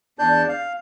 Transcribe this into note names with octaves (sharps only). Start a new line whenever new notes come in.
E2 D4 D5 A5 G6
F5